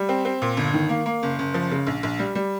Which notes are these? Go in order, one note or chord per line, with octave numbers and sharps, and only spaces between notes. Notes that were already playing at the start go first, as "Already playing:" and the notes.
Already playing: G3
C4
C4
A#2
G1
D#3
A#3
A#3
F#1
F#1
F3
C#3
A#1
A#1
G3
G3